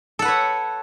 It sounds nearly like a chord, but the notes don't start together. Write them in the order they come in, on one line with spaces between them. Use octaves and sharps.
A4 F#5 B4 C#5